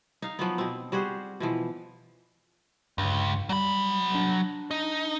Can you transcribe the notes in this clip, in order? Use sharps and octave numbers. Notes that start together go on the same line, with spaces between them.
D#4 F5
F3 F#3 B3
B2 C4
G3 F#4 G#4 C5
B2 E3 F3
C#2 G2
F#3 G3 B5
D4
D#4